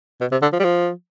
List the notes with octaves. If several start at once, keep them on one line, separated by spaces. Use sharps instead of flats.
B2
C3
D3
F3
G3
F3